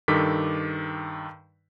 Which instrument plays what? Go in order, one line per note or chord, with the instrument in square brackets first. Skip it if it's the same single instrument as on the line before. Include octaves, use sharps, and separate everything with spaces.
[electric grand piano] G2 D#3 A4 D6 B6